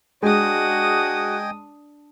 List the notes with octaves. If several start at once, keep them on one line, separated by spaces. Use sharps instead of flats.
G#3 D4 F#4 D#5 G5 G#5 D#6